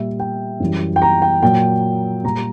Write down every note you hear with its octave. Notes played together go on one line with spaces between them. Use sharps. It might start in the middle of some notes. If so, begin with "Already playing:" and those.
Already playing: A#2 G3 E5
G5
F#2 E3 G3
G5
A#5
G5
A#2 F#3 G5
A#2 G3 A#5